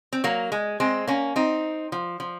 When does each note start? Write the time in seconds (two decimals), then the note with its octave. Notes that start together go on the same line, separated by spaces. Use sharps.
0.13 C4
0.24 F#3 A#3
0.52 G#3
0.80 G#3 C4
1.07 A#3 C#4
1.36 C4 D#4
1.92 F3
2.20 F3